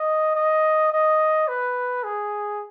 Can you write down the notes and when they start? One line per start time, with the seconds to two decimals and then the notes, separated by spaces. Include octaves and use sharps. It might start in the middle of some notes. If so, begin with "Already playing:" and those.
Already playing: D#5
0.35 D#5
0.92 D#5
1.48 B4
2.04 G#4